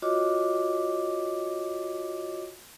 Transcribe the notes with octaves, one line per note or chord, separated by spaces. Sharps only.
F4 F#4 C#5 D#5 D6